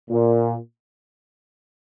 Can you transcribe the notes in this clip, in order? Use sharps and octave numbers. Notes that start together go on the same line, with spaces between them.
A#2